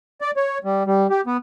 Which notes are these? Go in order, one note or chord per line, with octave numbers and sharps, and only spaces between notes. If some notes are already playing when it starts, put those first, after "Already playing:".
D5
C#5
G3
G3
G4
B3